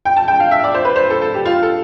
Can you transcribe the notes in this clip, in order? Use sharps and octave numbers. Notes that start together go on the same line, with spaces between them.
G5
A5
G5
F5
E5
D5
C5
B4
C5
A4
A4
G4
F4
A4